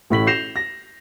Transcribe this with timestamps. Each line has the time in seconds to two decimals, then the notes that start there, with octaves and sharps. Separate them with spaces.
0.10 A1 A2 B6 F#7
0.27 G6 A#6 C7 E7 F7
0.56 A#6